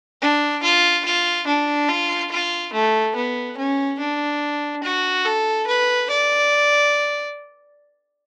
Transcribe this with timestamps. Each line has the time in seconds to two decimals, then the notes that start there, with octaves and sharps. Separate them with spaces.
0.22 D4
0.63 F4
1.05 F4
1.48 D4
1.89 F4
2.32 F4
2.73 A3
3.16 B3
3.57 C#4
3.99 D4
4.84 F#4
5.25 A4
5.68 B4
6.10 D5